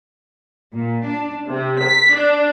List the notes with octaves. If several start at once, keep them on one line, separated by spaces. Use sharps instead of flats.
A#2
D4
C3
B6
D4